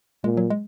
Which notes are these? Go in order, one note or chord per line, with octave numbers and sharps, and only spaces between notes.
A#2 G#3
F#3
G#3